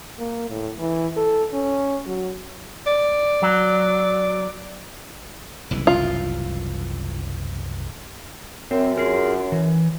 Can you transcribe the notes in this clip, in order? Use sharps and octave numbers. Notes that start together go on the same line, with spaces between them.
A#3
A2
E3
A4
C#4
F#3
D5
F#3
F#1 C2 E3
F4
F#2 C4
F4 G#4 A#4
E3